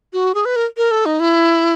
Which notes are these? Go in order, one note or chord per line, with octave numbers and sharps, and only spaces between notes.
F#4
G#4
B4
A#4
A#4
A4
D#4
E4